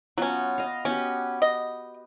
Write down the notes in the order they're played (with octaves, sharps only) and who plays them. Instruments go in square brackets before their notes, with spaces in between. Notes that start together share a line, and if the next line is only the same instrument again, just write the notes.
[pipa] F#3 C#4 [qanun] B3 F4 F#4
[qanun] D#5 F5
[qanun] B3 F#4 G4 [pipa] C#4
[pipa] D#5